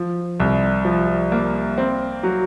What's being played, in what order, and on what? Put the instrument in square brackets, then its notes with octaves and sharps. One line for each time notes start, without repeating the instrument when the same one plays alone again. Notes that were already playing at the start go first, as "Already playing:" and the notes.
Already playing: [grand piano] F3
C2
F3
A#3
C4
F#3